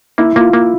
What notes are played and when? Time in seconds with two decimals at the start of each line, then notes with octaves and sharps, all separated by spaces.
0.18 A#3 E4
0.36 A#3 F4
0.53 A#3